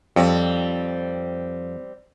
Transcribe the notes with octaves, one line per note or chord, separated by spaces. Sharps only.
F2 G3 C4